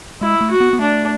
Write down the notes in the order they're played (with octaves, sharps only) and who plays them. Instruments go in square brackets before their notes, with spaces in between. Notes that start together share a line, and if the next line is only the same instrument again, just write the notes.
[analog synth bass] G#3 [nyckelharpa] E4
[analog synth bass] A3
[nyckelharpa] F#4
[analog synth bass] B3
B3
[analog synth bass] A3 [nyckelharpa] D4